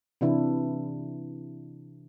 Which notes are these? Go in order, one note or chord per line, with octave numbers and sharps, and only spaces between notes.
C3 E3 D4 E4